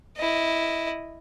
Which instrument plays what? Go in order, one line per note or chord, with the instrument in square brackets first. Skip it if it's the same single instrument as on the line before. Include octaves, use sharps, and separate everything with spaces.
[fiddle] E4 D#5